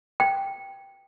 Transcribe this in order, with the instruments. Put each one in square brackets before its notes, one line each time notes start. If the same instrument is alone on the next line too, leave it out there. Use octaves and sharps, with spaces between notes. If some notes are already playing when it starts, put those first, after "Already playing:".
[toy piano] G5